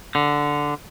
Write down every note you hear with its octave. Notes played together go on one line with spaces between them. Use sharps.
D3